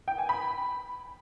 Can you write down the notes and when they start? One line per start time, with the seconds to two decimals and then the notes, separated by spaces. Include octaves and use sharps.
0.08 G5
0.18 G#5
0.29 B5